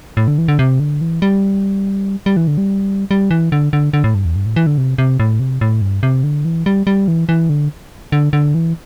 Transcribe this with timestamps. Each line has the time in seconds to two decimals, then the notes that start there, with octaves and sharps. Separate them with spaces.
0.17 A2
0.28 D3
0.38 E3
0.48 D3
0.59 C3
0.80 D3
1.01 E3
1.22 G3
2.26 G3
2.37 E3
2.47 D3
2.58 G3
3.11 G3
3.31 E3
3.52 D3
3.73 D3
3.93 D3
4.04 A2
4.15 G2
4.25 E2
4.36 G2
4.46 A2
4.56 E3
4.67 D3
4.78 C3
4.98 C3
5.20 A2
5.40 C3
5.61 A2
5.82 G2
6.03 C3
6.24 D3
6.45 E3
6.66 G3
6.87 G3
7.08 E3
7.29 E3
7.49 D3
8.12 D3
8.33 D3
8.55 E3